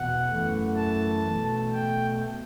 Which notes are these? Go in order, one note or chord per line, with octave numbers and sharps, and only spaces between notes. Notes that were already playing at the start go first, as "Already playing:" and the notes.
Already playing: E2 B2 F#5
F#2 E3 A3
A5
B2 A3
G5